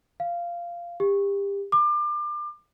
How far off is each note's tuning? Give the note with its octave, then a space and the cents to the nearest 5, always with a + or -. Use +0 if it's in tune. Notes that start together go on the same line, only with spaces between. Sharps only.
F5 -10
G4 +30
D6 +30